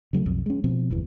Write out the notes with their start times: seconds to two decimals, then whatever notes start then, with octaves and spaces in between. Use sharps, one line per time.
0.13 C#3 F#3 G3 A3
0.26 B1 F2
0.46 G#3 C#4
0.64 B2 F3 C4
0.90 G1 E2 E3